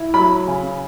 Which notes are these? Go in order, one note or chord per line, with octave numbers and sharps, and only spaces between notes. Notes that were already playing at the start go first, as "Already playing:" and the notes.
Already playing: E4
F#3 B5
C#3